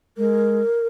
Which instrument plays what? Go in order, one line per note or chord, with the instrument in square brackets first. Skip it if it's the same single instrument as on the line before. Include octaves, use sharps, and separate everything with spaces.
[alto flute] G#3 [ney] A#4